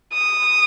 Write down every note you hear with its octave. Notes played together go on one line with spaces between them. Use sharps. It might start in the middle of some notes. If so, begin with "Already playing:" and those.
D#6